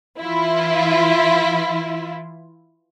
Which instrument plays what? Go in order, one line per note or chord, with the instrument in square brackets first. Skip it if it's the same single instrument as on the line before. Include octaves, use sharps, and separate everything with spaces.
[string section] E3 E4 F4